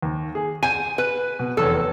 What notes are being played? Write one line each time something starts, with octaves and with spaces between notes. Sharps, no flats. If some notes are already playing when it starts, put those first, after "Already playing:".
D#2
G#4
C5 G#5 D#7
B4
B2
F1 E2 A4 C#5